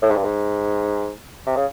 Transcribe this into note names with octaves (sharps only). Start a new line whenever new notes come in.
A2
G#2
G2
G#2
C3
C#3